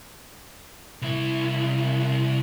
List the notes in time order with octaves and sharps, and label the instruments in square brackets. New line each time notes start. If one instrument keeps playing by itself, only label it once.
[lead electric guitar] C2 E4